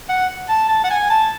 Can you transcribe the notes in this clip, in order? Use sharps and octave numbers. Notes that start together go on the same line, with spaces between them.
F#5
A5
A5
F#5
G#5
A5